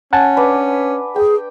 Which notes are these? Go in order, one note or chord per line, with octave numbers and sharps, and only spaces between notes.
C#4 F#5 G#5 A5
D4 B4 D6
G#4 G5